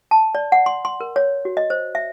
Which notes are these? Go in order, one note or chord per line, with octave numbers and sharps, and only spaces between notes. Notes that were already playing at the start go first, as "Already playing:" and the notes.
A5
D5
F#5
C6
C6
A#4
C#5
F#4
D#5
C5
E5